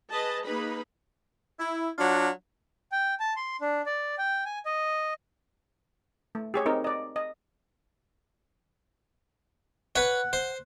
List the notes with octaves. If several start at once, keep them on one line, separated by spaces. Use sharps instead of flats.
G#4 B4 D#5 A5
A#3 D#4 G#4 B4 B5
E4
F#3 D4 F4 F#5
G5
A5
C6
D4
D5
G5
G#5
D#5
A3
G4 G#4 C#5
C4 D#4 A#4
D5 D#5
D#5
B4 C#5 F#5
C5